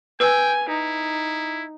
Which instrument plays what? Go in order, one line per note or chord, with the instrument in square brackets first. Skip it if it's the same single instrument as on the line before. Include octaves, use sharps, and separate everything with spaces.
[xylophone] B4 E6 [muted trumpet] G5 [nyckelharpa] G#5
[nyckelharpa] D#4 [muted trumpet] E4